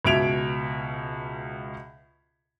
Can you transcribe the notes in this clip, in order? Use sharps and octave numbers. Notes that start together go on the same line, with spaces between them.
C#2 B2 E5 G#6 D7 F7